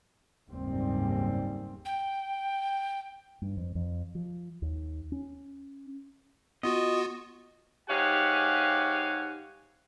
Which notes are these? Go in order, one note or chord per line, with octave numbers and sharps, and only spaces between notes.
F#1 D#2 G#2 G3 C4
G5
G2
F2
F2
F3
D#2
C#4
B3 F4 F#4 D#5
G#2 G4 C#5 F5 F#5 G#5